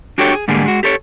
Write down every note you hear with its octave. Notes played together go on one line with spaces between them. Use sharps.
D4 F#4 G4 A4 C#5
G#4
G#2 D3 G3 A#3 G#4
G#3 F#4
G4 A4 C5 C#5